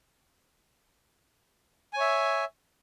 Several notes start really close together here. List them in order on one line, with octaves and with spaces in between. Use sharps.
G#5 C#5 E5